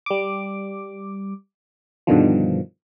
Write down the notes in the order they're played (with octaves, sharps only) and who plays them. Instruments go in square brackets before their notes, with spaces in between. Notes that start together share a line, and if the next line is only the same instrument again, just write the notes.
[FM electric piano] G3 D6
G2 B2 D3 D#3 F3